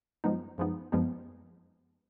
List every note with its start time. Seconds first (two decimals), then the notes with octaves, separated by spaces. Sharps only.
0.24 F#2 F3 G#3 B3 D#4
0.58 F#2 F3 G#3 B3 D#4
0.92 F#2 F3 G#3 B3 D#4